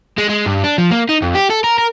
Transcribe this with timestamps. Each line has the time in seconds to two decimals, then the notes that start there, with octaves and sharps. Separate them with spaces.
0.18 G#3
0.29 G#3
0.46 G2
0.64 D4
0.78 F3
0.91 A#3
1.09 D#4
1.22 F2
1.35 G4
1.50 A4
1.64 A#4
1.78 A#4